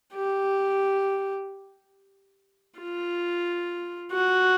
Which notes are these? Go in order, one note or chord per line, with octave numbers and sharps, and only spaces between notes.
G4
F4
F#4